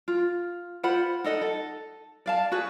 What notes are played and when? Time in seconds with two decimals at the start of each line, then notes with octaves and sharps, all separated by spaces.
0.08 F4
0.83 F4 C5 F#5 B5
1.24 D#4 A4 D#5 F#5
1.41 A4
2.26 D5 F5 A5
2.52 F#4 G#4 B4